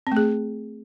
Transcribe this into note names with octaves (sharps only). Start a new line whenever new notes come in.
A3 C4 G#4